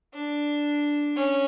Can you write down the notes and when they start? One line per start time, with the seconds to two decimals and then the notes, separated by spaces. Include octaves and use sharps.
0.14 D4
1.16 C#4